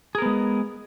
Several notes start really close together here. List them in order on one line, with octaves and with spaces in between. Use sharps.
G#4 A#4 B3 G#3